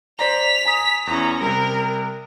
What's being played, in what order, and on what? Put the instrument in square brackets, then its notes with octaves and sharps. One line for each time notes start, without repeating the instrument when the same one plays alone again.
[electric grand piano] C5 D5 A#5 [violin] B6 F7
[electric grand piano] G#5 A#5 D#6
[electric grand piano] E2 E4 [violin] C#4 A#5
[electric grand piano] C3 G3 [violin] A#4